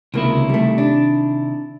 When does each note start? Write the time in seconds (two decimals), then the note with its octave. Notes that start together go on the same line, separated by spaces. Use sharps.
0.14 C#2 C3 D#3 A#3 E4
0.49 G3 A3
0.78 D4